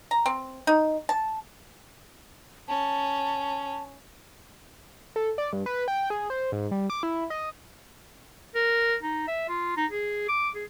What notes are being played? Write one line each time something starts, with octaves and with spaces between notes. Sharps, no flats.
A#5
C4
D#4
A5
C#4 A5
A4
D5
G2
B4
G5
G#4
C5
G#2
G3
D6
E4
D#5
A#4
D#4
E5
F4
D#4
G#4
D6
G#4